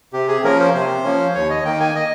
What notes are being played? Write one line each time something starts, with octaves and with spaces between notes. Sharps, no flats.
C3 G4
G#4
F3 A#3 C#4 A#4
C5
C3 C5
F3 A#3 C#4
D#2 C#5
D#5
D#3 A#3 G5
G#5
D#5